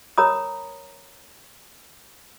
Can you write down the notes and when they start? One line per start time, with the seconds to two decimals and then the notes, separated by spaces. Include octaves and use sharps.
0.18 A#4 C#5 A#5 B5 D#6